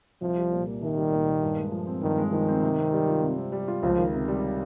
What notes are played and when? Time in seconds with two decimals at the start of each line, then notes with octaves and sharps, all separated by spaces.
0.22 C2 F3
0.37 G3
0.52 A#2
0.67 A#3
0.82 C2 D#3
0.97 G3
1.12 A#2
1.28 A#3
1.43 G2
1.58 G#3
1.72 F3
1.87 C4
2.02 G2 D#3
2.18 G#3
2.32 D#3 F3
2.48 C4
2.63 C3
2.78 C4
2.93 G3
3.08 F4
3.22 C3
3.38 C4
3.52 G3
3.68 F4
3.83 C#2 F3
3.98 D#3
4.13 C3
4.28 G3